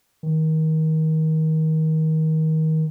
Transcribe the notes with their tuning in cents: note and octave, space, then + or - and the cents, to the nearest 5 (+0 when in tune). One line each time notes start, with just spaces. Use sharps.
D#3 +25